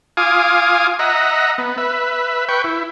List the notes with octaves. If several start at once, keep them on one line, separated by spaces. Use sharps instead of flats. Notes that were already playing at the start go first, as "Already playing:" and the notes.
F4 F5 G#5 D6 D#6
D#5 E5 F#5 A#5
B3
B4 E5
B4 G5 C#6
E4